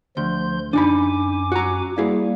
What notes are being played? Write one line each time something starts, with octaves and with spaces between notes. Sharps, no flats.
D2 F3 C6 G6
F#2 D4 D#4 G#5 B5 D6
F#4 A#5
G3 A#3 E4 G#4